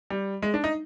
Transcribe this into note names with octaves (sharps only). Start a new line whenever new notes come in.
G3
G#3
D4
D#4